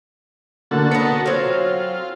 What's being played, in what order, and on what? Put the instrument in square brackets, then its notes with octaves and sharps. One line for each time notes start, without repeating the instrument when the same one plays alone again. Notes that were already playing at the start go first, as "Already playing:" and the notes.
[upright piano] D3 A#3 [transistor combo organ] F#4 A4
[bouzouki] B3 D#4 [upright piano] C#7
[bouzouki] F#3 C4 [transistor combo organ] F4